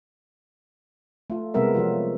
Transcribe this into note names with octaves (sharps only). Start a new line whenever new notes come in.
A3 F4
C3 G3 G#3 B3 A#4 E5
F3 F#3 F4